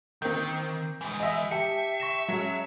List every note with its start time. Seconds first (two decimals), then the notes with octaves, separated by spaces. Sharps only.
0.22 D#3 A#3 C4 G6
1.01 E3 G#3
1.20 D#5 E5
1.51 G4 E5 A5 C#7
2.00 C#6 A#6 E7
2.28 F#3 G#3 C#4